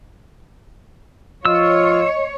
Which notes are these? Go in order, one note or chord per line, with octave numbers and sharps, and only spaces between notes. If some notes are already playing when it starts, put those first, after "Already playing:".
F3 F4 C#5 D#5 E6